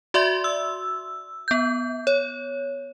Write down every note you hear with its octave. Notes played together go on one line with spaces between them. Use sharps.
F#4 D5 E5 C6
E6
B3 G6
C#5